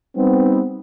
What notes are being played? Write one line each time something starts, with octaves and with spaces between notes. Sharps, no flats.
G3 B3 C4 D#4